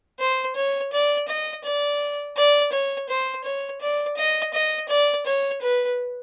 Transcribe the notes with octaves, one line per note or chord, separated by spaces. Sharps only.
C5
C#5
D5
D#5
D5
D5
C#5
C5
C#5
D5
D#5
D#5
D5
C#5
B4